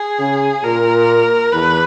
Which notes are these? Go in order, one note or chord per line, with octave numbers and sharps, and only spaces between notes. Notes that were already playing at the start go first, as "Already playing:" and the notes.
Already playing: G#4
C#3
A#2 A#4
E2 B4